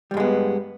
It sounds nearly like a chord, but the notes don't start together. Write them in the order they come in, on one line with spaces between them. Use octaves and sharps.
G3 G2 G#3 B3